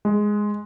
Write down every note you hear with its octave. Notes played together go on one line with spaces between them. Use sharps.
G#3